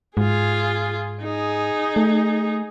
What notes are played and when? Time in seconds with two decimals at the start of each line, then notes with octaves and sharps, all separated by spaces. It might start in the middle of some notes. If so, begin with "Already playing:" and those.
0.17 G#2 F4 G#4
1.23 D#4 G#4
1.96 A3